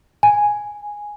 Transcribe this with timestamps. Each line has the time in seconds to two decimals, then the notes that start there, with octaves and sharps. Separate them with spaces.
0.23 G#5